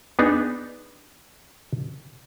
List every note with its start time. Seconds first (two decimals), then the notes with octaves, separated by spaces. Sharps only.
0.19 B3 D4 D#4 G#4